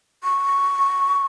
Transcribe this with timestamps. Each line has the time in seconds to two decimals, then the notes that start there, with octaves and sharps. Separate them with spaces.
0.24 C#6